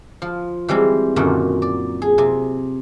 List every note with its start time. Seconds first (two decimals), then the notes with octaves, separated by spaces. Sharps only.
0.22 F3
0.68 E3 G3 G#3 C4
1.16 F#2 A#2 D3 D#3 F#4
1.62 D5
2.02 G#4
2.18 C3